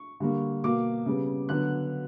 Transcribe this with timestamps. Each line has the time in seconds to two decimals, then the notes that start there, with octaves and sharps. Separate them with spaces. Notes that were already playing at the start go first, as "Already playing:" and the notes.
Already playing: C#6
0.20 D3 G3 A#3
0.64 B2 A#3 D6
1.06 C#3 G3 B3
1.49 D3 F#3 B3 F#6